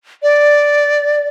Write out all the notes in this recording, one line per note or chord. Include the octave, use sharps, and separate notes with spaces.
D5